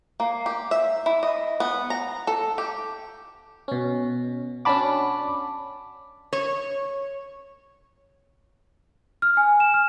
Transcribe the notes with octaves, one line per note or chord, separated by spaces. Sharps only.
A#3
G4
E5
E4
D#5
B3
A#5
A4
G4
B2 C#4
C#4 D4 F#4 A5 B5 D6
C#5
F6
G#5
E7
F6